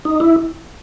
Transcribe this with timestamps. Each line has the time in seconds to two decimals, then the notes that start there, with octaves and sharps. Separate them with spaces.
0.05 D#4
0.20 E4